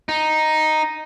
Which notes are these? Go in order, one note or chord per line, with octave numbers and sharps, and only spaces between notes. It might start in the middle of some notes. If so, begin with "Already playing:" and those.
D#4